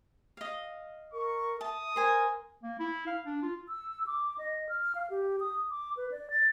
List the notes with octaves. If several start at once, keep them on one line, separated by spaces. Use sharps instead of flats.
D#5 F5
A#4 C#6
E5 A5 D#6
A#4 C5 G#5
A#3
E4
F5
D4
F4
E6
D6
D#5
F6
F5
G4
D#6
D6
B4
D5
A6